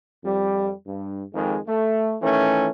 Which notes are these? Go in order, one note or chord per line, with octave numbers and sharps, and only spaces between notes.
F2 G3
G2
F2 D#3 G#3
A3
D#3 E3 A3 C#4